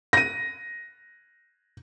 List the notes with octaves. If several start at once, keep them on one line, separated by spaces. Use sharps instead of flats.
A#6 D#7